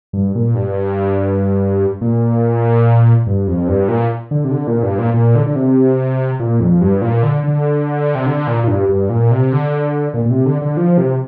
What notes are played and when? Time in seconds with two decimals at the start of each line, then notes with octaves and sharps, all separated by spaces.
0.13 G2
0.35 A#2
0.55 G2
2.01 A#2
3.27 G2
3.47 F2
3.68 G2
3.88 A#2
4.31 D3
4.44 C3
4.51 D3
4.67 A#2
4.83 G2
4.99 A#2
5.14 A#2
5.36 D3
5.46 D3
5.56 C3
6.40 A#2
6.60 F2
6.81 G2
7.02 A#2
7.23 D3
7.44 D3
8.15 C3
8.26 D3
8.47 A#2
8.64 A#2
8.68 G2
8.89 G2
9.10 A#2
9.31 C3
9.52 D3
10.14 A#2
10.25 A#2
10.31 C3
10.46 D3
10.62 D3
10.77 F3
10.98 C3